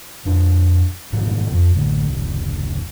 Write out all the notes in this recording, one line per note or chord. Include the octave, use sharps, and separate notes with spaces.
F2 D4
G#2 B2 E3 F3
F2
A1 D2
E1 C2